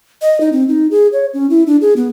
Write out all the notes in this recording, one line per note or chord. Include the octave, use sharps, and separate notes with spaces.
D#5
D#4
C4
D#4
G#4
C#5
C#4
E4
D4
G#4
B3